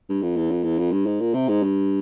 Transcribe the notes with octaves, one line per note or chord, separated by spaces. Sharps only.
G2
F2
E2
F2
E2
F2
G2
G#2
A#2
C3
G#2
G2